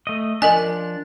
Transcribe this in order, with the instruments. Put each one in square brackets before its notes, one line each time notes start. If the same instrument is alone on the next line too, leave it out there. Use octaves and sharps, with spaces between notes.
[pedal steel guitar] A3 D#5
[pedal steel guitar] F3 D4 [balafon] A#4 D#5 G#5